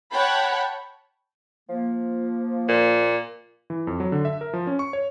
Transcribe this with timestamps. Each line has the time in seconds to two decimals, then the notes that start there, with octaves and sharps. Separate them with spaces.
0.11 C#5 F#5 G5 A5 B5
1.69 F3 A#3
2.69 A#2
3.70 E3
3.87 F2
4.00 F#3
4.12 D3
4.25 E5
4.41 A#4
4.53 F3
4.67 C#4
4.79 C#6
4.93 C#5